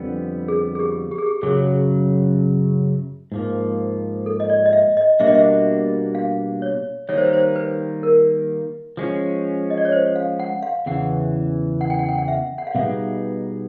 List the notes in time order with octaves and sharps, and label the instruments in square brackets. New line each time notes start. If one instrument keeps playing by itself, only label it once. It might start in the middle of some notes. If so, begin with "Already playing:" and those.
Already playing: [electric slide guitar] F2 D3 G3 B3
[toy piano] G#4
G#4
G4
G4
G#4
G4
[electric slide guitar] F#2 C#3 F#3 [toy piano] G#4
[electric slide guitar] G#2 F3 A#3
[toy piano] A4
D#5
D5
D#5
E5
D#5
[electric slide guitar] B2 G3 A#3 D4 F#4 [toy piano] E5
[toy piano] D#5
E5
F5
C#5
[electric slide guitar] D#3 G3 A#3 D#4 [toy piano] C#5
[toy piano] C5
B4
C5
B4
A#4
[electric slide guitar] F3 G#3 C#4
[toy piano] D#5
D5
C#5
C5
F5
F#5
F5
[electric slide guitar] E2 C#3 E3 [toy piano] F#5
[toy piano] F#5
G5
F#5
G5
F#5
E5
F#5
F5
[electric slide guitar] B2 G3 B3 D#4 G#4 [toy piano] E5